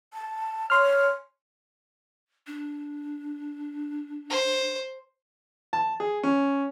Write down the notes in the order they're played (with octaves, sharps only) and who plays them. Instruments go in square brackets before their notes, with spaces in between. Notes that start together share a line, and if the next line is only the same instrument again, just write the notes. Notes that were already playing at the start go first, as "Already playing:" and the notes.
[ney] A5
[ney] C#5 [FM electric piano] C6 F6
[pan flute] D4
[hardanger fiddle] C5
[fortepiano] A5
G#4
C#4